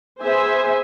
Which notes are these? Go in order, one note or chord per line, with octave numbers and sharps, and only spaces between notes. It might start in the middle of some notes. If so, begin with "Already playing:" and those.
B3 G#4 C5 E5 G#5